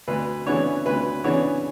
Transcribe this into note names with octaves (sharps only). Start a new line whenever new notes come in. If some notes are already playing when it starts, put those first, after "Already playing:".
D2 B4
C#3 E3 B3 D4 C#5
D2 B4
C#3 E3 B3 D4 C#5